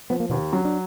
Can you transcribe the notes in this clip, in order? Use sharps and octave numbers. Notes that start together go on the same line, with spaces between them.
F3 B3
A#3
D#2 B2 B3
F#3 C#4
D4